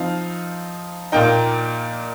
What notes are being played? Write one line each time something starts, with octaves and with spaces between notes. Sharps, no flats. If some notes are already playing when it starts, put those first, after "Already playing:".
Already playing: F3 C4 D#4 F5
A#2 A#3 D#4 G5